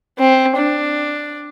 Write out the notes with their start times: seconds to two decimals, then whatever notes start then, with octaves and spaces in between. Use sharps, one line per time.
0.19 C4
0.57 D4